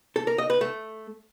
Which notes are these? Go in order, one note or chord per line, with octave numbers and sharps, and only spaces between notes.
A4
A#4
D#5
B4
A3